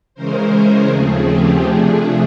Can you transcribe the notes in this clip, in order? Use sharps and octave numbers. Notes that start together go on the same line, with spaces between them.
C#3 E3 G#3 C#4 A#4 C5
G#4 A#4
D#2 C#3 F3 A3 C4 G#4
G4
C3 F3 A3 D4 G#4